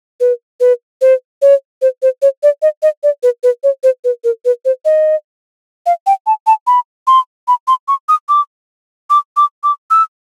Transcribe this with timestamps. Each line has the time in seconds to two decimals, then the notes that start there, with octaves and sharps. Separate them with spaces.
0.20 B4
0.60 B4
1.01 C5
1.42 C#5
1.82 C5
2.02 C5
2.22 C#5
2.43 D5
2.62 D#5
2.83 D#5
3.03 D5
3.23 B4
3.43 B4
3.63 C#5
3.83 C5
4.04 B4
4.24 A#4
4.45 B4
4.65 C5
4.85 D#5
5.86 F5
6.06 G5
6.26 A5
6.47 A5
6.67 B5
7.07 C6
7.48 B5
7.68 C6
7.88 C#6
8.09 D#6
8.29 D6
9.10 D6
9.37 D6
9.64 D6
9.90 E6